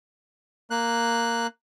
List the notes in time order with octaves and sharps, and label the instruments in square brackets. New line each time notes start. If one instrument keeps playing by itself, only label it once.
[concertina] A#3 F#6